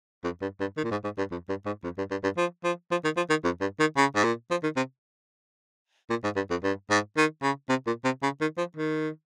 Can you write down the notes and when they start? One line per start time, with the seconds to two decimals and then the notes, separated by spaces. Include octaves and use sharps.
0.24 F2
0.41 G2
0.60 G2
0.77 D#3
0.84 A#2
0.91 G#2
1.04 G#2
1.18 G2
1.31 F2
1.49 G2
1.66 G#2
1.84 F2
1.98 G2
2.11 G2
2.23 G2
2.37 F3
2.64 F3
2.91 F3
3.04 D#3
3.16 F3
3.30 D#3
3.44 F2
3.61 G2
3.80 D#3
3.97 C#3
4.15 G#2
4.24 A#2
4.51 F3
4.63 D#3
4.76 C3
6.10 A#2
6.24 G#2
6.36 G2
6.50 F2
6.63 G2
6.90 G#2
7.17 D#3
7.42 C#3
7.69 C3
7.87 A#2
8.04 C3
8.23 C#3
8.41 D#3
8.58 F3
8.77 D#3